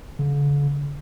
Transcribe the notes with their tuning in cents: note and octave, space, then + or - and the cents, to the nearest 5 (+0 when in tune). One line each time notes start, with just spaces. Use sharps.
D3 -45